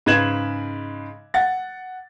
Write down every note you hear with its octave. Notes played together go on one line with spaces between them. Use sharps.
G#2 C#3 B4 G#6 E7 F#7
F#5 A6